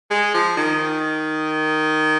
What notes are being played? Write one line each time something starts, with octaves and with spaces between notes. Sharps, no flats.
G#3
F3
D#3